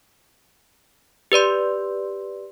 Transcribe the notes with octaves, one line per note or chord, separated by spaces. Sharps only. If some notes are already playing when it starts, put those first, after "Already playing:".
G4 B4 D5 C6